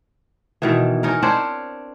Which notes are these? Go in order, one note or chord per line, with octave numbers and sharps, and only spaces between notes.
B2 D#3 E3
C#4 D#4 A#4
C4 D4 C5 C#5